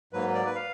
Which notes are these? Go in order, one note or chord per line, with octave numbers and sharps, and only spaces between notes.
G#2 F#3 A#3 B4
D5
B4
F5